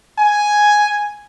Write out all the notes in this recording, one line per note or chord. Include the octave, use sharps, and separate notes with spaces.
G#5